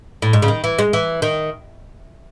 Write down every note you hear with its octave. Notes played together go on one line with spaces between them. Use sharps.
A2
G#2
C#3
D#3
E3
G#3
E3
D#3